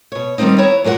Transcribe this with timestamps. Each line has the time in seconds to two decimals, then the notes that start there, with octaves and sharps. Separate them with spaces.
0.12 B2 C#5
0.38 D#3 G3 A3 B3 C4 D#4
0.58 B3 E4 C#5 A#5
0.84 A#2 F#3 A#4 C5 F#5